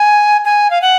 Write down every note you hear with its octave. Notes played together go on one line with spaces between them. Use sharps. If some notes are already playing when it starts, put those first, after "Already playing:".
Already playing: G#5
G#5
F5
F#5